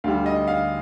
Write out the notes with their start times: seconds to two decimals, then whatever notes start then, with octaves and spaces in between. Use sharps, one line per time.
0.04 D2 D3 G3 F5
0.26 D#5
0.47 F5